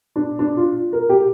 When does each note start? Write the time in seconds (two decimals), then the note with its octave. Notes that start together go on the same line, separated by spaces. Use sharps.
0.16 D4
0.39 D4
0.57 F4
0.93 A#4
1.09 G4